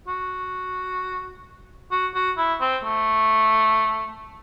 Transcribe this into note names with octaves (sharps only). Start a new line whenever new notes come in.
F#4
F#4
F#4
E4
C4
A3